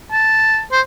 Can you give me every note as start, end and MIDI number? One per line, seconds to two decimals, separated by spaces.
0.12 0.63 81
0.72 0.81 72